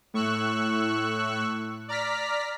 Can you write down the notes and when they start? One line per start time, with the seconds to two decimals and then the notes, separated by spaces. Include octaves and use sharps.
0.14 A2 C#6 E6 F#6
1.88 D5 A#5 F6 B6